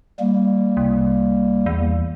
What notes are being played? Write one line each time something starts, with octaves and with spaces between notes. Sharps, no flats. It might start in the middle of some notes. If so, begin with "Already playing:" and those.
G3 A#3
C2
E2